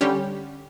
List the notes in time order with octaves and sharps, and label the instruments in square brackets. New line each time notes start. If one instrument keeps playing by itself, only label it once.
[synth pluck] D3 G3 C#4 G4